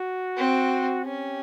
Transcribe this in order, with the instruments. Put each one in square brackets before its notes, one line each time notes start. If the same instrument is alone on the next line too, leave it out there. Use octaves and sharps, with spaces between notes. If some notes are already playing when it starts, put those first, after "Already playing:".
Already playing: [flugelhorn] F#4
[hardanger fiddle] C4
[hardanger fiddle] C#4 [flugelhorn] G4